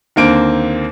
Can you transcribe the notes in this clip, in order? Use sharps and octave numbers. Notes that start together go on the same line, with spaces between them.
D#2 D3 A#3 C4 D7